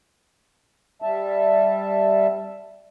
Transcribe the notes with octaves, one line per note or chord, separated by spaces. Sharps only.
G3 E5 A5